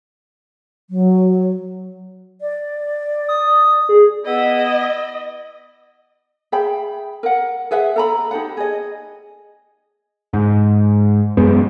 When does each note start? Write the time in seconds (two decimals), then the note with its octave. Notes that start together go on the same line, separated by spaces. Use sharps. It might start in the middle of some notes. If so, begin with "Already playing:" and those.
0.90 F#3
2.41 D5
3.28 D#6
3.89 G#4
4.26 B3 E4 D#5
6.52 G#4 E5 G5 B5
7.23 A#4 F#5
7.71 G#4 B4 E5 F#5
7.96 A4 A#5 B5
8.31 D#4 G4 A4 F#5
8.57 G#4 D#5
10.33 G#2
11.37 A1 F#2 G#3 B3